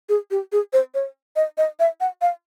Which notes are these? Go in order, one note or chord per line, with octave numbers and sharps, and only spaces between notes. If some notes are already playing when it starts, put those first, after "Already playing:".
G#4
G4
G#4
C5
C#5
D#5
D#5
E5
F#5
F5